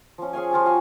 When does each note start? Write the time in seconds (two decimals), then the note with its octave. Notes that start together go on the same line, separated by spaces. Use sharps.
0.18 F3 C#4
0.33 G#4 C#5 F5 G#5
0.51 F3 F4 G4 G#5
0.65 F#4 F5 G#5